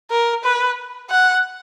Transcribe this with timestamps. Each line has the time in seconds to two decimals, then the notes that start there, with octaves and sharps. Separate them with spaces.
0.11 A#4
0.44 B4
1.10 F#5